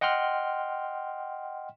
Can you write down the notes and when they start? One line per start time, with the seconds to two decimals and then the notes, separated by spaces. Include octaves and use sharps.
0.01 D#5 F#5 G5 C6 F6